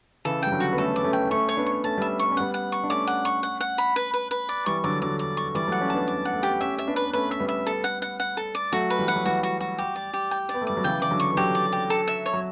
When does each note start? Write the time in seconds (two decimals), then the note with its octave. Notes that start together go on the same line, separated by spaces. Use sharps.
0.25 C#3 E3 A4
0.43 G3 G5
0.52 D3 F#3
0.60 F#4
0.73 B3
0.78 A3 C#4 A4
0.96 B3 D5
1.04 A3 C#4
1.13 G5
1.31 A3 C#4 C#6
1.49 C#5
1.57 B3 D4
1.66 C#6
1.84 A3 C#4 A5
1.97 G3 B3 E5
2.20 B3 C#6
2.32 C#4
2.37 G3 B3 F#5
2.54 F#5
2.72 C#6
2.84 D4
2.90 A3 C#4 D5
3.07 F#5
3.25 C#6
3.43 F#5
3.61 F#5
3.78 B5
3.96 B4
4.14 B4
4.31 B4
4.49 D5
4.66 E3 G3 C#6
4.84 D3 F#3 D5
5.02 D3 F#3 D5
5.19 D5
5.37 C#6
5.55 E3 G3 D5
5.68 F#3 A3 F#5
5.81 A3 C#4
5.90 B3 D4 A5
6.08 D5
6.25 F#5
6.33 A3
6.43 B3 G4
6.61 A3 C#4 E5
6.78 E5
6.87 B3 D4
6.96 B4
7.05 B3
7.13 A3 C#4 B4
7.31 E5
7.40 G3 B3
7.49 E5
7.67 A4
7.84 F#5
8.02 F#5
8.20 F#5
8.37 A4
8.55 D5
8.72 F#3 A3 F#4
8.90 B4
8.99 E3 G3
9.08 F#5
9.16 F#3
9.25 E3 G3 F#4
9.43 F#4
9.60 F#4
9.79 G4
9.96 D5
10.13 G4
10.31 G5
10.49 D5
10.54 B3
10.61 A3
10.67 G3 D5
10.77 F#3
10.84 C#3 E3 G5
11.01 E3 D5
11.11 D3 F#3
11.20 C#6
11.32 E3
11.37 D3 F#3 G4
11.55 D5
11.73 G4
11.90 A4
12.08 E5
12.26 C#5
12.33 F#3